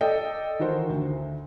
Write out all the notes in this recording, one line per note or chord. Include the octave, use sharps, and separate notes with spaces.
A4 D5 D#5 G5
D#3 E3 F#4 A#4 C5
D2